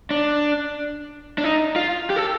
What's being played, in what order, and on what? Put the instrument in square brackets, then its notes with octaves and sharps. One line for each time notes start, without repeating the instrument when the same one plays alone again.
[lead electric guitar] D4
D4
D#4
F4
G4
A4